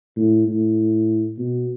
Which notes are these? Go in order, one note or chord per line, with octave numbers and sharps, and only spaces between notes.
A2
A2
B2